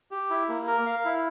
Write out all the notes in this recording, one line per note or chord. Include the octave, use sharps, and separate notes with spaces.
G4
E4
A#3
A#4
F5
E4